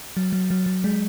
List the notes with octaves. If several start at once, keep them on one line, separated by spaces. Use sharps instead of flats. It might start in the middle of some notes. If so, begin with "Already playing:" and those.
F#3
F#3
F#3
F#3
G#3